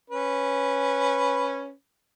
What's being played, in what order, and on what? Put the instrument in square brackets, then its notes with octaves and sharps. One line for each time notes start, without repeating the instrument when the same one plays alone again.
[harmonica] C#4 B4